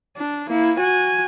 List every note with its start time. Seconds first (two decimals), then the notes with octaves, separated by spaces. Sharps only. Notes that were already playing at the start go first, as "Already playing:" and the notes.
0.16 D4
0.48 A#3 E4
0.79 F#4 G#5